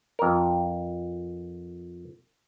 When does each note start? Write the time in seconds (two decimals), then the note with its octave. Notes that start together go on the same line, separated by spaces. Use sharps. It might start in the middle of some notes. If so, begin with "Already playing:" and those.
0.19 F2 A#4